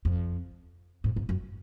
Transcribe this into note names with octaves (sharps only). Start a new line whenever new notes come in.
F2
G#2
G#2
F#2